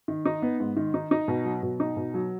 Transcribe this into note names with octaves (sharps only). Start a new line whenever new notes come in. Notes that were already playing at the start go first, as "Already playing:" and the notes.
D#3
D#4
B3
G#2
D#3
D#4
D#4
B2
F#3
B2
D#4
B2
F#3